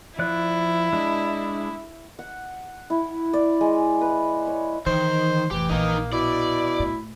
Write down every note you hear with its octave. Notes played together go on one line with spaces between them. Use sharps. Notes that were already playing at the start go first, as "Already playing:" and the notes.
F3 E4 D5 F#6
G#3 D4
F#5
E4
D5
G#3
B4
C#5
D#3 E3 C5
F1 A2 E3 G4
A#1 A#3 D#4 A#4 D#5
B2 E4 D5
A2